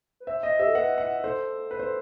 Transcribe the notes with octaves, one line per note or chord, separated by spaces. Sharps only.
B4
C5 E5
D#5
G4 E5
A4
B4 F#5
F#5
A4 C5
B4
C5